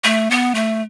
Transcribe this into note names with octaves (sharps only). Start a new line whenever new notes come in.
A3
B3
A3